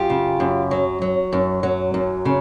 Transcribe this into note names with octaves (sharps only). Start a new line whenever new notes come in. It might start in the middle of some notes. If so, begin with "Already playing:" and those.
Already playing: F#2 F4 G4
C#3
F#2
F#3
F#3
F#2
F#3
F#2
C#3